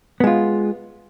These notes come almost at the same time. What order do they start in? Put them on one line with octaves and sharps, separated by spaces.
B3 G#3 F4